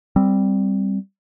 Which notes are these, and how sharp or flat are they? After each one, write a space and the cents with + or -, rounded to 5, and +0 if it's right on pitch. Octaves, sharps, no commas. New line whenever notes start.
G3 +0 C4 +0